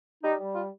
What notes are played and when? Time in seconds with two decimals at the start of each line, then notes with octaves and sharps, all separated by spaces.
0.23 G3 D#4
0.40 G3
0.55 F4